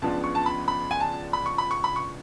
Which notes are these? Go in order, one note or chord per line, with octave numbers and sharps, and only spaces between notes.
C#2 C#3 F3 B3 D4 A5
C#6
A5
B5
B5
G#5
A5
B5
C#6
B5
C#6
B5
C#6